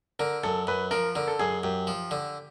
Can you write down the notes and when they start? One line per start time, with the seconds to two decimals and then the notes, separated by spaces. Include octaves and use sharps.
0.19 D3 A#4
0.43 F#2 A4
0.67 F#2 B4
0.91 F3 A#4
1.15 D3 A#4
1.28 A4
1.39 F#2 G#4
1.63 F#2 G4
1.87 F3
2.11 D3